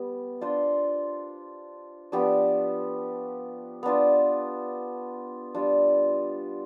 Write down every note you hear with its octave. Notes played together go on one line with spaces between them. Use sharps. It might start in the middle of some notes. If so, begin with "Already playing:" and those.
Already playing: G3 B3
D4 F4 C5
F3 B3 D4 G4
B3 D4 F4
G3 D4 F4